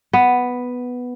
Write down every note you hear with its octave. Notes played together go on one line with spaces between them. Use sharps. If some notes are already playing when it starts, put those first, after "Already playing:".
B3